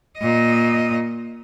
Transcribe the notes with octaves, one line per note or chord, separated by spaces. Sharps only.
A#2 D#5